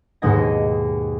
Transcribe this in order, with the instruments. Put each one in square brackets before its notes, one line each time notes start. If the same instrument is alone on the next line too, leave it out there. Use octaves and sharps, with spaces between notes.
[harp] D#2 G#2 B2 D#5 G#5 A#6